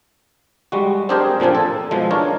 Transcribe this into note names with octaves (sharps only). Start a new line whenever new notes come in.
G3 G#3 F#4
C4 D4 G4 G#4 A#4 C5
A#2 F3 C4 D4 G#5
A4
B2 F3 G#3
D4 F4 A#4 C#5